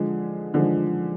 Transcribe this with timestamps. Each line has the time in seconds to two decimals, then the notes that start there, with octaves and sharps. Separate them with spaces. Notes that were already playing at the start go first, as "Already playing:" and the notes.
Already playing: D3 F3 G#3
0.54 D3 F3 G#3